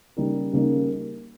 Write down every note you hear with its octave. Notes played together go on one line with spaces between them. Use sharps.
C#3 G3 A#3 D#4 A#4
C#3 G3 A#3 D#4 A#4